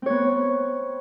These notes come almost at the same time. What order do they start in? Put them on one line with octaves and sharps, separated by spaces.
C4 C#5 B3